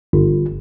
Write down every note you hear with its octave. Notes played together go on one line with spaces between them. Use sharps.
G1